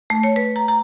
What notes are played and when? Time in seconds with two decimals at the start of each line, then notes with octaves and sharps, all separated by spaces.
0.10 A3
0.24 C#5
0.36 B4
0.56 A#5
0.68 A#5